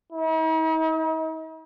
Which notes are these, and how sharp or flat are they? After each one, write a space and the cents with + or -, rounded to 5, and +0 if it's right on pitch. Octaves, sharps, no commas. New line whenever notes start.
D#4 +45